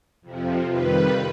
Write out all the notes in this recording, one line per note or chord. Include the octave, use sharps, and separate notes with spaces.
F2 C3 F3
F2 D#3 G3 B4